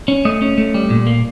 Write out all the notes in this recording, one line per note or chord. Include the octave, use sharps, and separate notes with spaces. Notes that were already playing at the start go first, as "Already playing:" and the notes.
C#4
A3 D#5
C#4
A3
G3
A#2
A#3